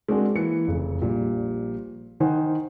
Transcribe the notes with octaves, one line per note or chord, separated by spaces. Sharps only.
G#3 C4 D4 F#4 G#4 A#4
E3 A#3 C#7
F1 C#3
A#1 A#2 G3
D#3 D#4 C5 F#5 G#5